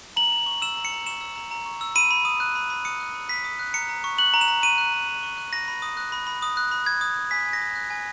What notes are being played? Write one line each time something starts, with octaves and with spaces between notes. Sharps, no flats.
A#5 F#7
A#5
C#6
E6 E7
A#5
C#7
A#5
C#6 E7
E6
A#5
A#5
C#6
E6
B5 D#7
B5
D#6
F#6
B5
B5
D#6 C#7
F#6
B5
B5 B6
D#6
F#6
A#5 C#7
A#5
C#6
F#6 F#7
A#5
E7
A#5
C#6 D#7
F#6
A#5
A#5
C#6
F#6
B5 A#6
B5
D#6
F#6
B5
B5
D#6
F#6
B5
B5 G#6
D#6
F#6
G#5 B6
G#5
A#6
D#6
F#6
G#5